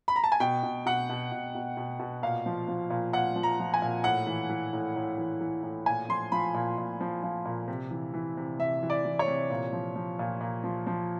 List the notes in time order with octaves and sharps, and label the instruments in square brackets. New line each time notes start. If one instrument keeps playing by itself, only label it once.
[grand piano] B5
A#5
A5
G#5
B2 G5
B2
B2 F#5
B2
B2
B2
B2
B2
A#2 F5
F3
F3
A#2
A#2 F#5
F3
A#5
F3
G#5
A#2
A2 F#5
E3
E3
A2
A2
E3
E3
A2
A#2 G#5
F3 C6
F3 B5
A#2
A#2
F3
F3
A#2
C3
E3
E3
C3
C3 E5
E3
D5
E3
C#5
C3
A#2
F3
F3
A#2
A#2
F3
F3